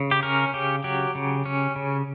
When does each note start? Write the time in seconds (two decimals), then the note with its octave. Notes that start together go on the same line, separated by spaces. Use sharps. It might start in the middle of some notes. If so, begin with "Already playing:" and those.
Already playing: C#3
0.11 G4
0.23 C#4 A#4
0.54 C#3 G4
0.84 F#3 G4
1.15 C#3
1.46 C#4
1.76 C#3